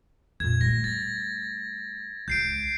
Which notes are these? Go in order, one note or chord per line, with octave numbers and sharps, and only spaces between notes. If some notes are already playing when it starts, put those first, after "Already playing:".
F2 A#2 G#6
G3 A3 A#6
A6
C#2 G6 C7 D7